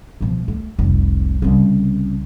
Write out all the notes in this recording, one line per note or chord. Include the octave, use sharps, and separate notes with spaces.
B2 F3
A3
F1 C2
C2 C#3